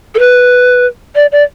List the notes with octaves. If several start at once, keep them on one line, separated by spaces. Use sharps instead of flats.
A4
B4
D5
D5